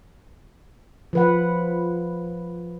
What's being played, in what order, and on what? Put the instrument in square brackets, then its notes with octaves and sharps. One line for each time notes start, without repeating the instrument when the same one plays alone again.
[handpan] F3 B4 F#5